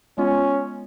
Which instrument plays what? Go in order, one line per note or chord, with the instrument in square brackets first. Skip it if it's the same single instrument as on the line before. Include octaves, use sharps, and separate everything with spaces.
[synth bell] G#3 B3 F4 [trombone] C#4